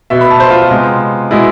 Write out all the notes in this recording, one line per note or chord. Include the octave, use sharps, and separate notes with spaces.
B2 B3 E5
B5
A5
C5
F4
F4
C3 G#3 B3
B2 G#3 B3 E4